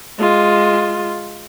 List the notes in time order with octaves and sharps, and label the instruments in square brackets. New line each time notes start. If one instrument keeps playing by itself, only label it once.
[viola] G#3 F4